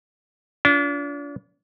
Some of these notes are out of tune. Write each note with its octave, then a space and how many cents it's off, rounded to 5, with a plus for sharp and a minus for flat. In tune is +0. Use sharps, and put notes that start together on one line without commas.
D4 -40 F4 +0